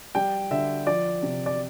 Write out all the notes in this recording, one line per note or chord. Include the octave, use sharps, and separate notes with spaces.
G3 G5
D3 E5
F3 D5
C3
D5